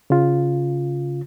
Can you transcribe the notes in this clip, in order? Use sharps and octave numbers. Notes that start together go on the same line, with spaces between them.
C#3 F4